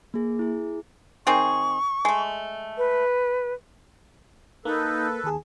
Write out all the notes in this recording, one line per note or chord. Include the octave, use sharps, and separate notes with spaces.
A#3 G#4
E4 G#4
D#3 C4 G#4 C#6
G#3 A3
B4
A#3 D#4 A4 B4
D#2 G#4 A5